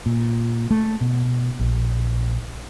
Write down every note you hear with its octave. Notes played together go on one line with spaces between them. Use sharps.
A#2
A3
B2
A#1